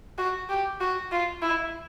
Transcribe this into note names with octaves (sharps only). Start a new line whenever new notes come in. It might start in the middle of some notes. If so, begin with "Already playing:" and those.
F#4
G4
F#4
F4
E4